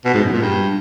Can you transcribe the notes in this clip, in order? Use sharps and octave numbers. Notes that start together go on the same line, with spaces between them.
B2
G#2
F#2
A#2
G2